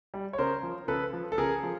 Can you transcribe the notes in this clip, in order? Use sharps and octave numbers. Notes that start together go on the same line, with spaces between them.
G3
C#5
C#3 A#4 C5
F3
C#3 A4 B4
F3
A4
C#3 G#4 A#4
F3